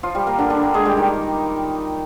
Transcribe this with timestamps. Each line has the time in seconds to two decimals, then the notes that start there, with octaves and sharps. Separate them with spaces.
0.03 F3 F4
0.15 G3 G4
0.27 A#3 A#4
0.38 D3 D4
0.50 D3 D4
0.62 A#3 A#4
0.74 G#3 G#4
0.85 G3 G4
0.97 D#3 D#4